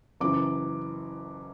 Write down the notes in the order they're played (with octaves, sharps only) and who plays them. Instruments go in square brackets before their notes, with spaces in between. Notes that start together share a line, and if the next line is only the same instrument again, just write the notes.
[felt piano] F#1 F#2 E3 D6